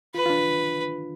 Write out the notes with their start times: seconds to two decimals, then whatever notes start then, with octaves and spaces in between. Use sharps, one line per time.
0.14 F4 B4
0.26 F4
0.30 D4